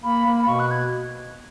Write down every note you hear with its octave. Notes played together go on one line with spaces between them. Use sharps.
A#3 B5
A#3
B5
B2 C#6
F#6
G#6